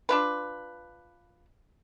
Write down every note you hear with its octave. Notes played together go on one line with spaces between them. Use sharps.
D4 F4 B4